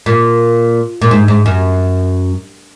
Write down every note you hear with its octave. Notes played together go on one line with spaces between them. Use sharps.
A#2
A#2
G#2
G#2
F#2